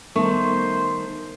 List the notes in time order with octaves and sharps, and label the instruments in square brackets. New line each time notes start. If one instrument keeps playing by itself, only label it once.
[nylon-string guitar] D#3 [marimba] G3 B3 C#6 [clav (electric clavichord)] A3 [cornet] C5